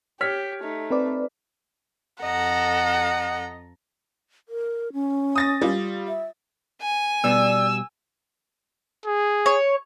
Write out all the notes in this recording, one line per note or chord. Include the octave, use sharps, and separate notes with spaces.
G4 C#5 F6 B6
A3 D#4
C4 B4 D5
F2 A4 D#5 F#5 A#5
A#4
C#4
D#6 A6 A#6
G3 F4
E5
G#5
B2 G3 B3 D5 E6
G#4
C#5